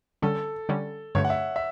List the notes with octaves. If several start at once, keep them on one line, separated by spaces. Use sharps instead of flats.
D3 G3 C#4 A4
D3 G3 C#4
G2 D3 A3 C#5
F#5
E5
E5